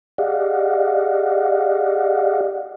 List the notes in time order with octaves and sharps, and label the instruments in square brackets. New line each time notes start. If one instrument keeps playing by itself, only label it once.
[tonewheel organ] G4 G#4 D5 D#5 F5 F#5